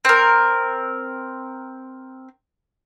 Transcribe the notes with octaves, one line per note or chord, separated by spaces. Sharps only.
C4 A#4